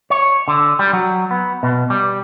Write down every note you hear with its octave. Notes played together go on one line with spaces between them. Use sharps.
C#5
D3
G3
F#3
B3
B2
G3